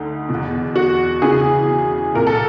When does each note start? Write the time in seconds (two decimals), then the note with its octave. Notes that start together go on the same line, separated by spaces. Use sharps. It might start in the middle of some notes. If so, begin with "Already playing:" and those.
Already playing: D2 D3 D#4
0.29 B2
0.34 E2
0.76 F#4
1.22 E2 C#3 E3 G#4
2.15 C2 A#2 A#4
2.27 A4